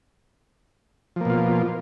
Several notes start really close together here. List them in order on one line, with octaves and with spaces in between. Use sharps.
F3 A#3 B2 F4